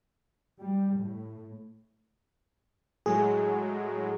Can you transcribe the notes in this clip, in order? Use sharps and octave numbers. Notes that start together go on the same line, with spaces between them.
G3
A2
A2 F#3 G#3 G#4